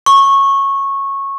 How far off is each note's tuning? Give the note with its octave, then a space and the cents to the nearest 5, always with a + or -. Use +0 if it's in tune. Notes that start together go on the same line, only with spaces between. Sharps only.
C#6 -15